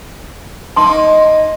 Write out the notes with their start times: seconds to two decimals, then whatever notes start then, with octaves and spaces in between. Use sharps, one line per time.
0.76 A#3 D#4 A5 C6